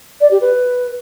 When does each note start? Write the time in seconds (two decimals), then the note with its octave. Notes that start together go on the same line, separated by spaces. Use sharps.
0.21 D5
0.31 G4
0.41 B4